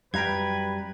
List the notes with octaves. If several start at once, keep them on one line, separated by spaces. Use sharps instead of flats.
F#2 G3 B4 F5 G5 A#5 G#6